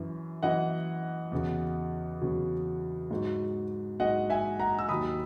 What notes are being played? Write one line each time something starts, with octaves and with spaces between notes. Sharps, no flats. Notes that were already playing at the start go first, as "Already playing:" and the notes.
Already playing: F#2 E3
F#2 E3 D#5 F#5
E2 C#3 F#3
E2 C#3 F#3
G#2 F#3
G#2 F#3 D#5 F#5
E5 G#5
F#5 A#5
E6
D#2 D#3 F#3 B5 D#6